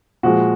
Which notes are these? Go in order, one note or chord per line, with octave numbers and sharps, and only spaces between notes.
A#2 F3 G#3 F#4